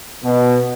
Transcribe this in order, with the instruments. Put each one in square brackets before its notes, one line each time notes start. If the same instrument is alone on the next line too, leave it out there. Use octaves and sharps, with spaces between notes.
[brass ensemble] B2